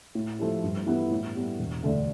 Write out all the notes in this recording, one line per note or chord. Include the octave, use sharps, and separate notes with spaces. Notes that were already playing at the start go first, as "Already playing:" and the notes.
A2
F3 A3 E4 G4
G2
E3 B3 E4 G4
A2
G3 B3
E1
D2 D3 A3 D4